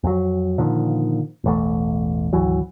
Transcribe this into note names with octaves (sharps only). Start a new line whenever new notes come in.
F2 F#3
A#2 D3 D#3 F3
E1 A1 A3
G#1 D2 E3 F#3